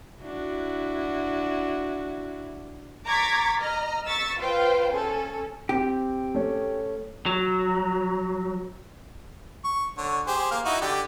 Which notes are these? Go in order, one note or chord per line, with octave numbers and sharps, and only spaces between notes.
D4 E4 F#4
A#5 C#6 D6 G#6 A6 B6
D#5 A#5 F6
C#6 E6 A6 B6
F4 B4 C5 F5 G5
C#4 A4
C4 G4
A3 C#4
F#3
C#6
D3 C#5
G4 G#4 C5
A#3 F5
D#4 E4 F#4
D3 G4 D5